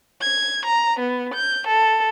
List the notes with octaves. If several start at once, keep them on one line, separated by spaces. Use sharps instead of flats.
G#6
A#5
B3
G6
A4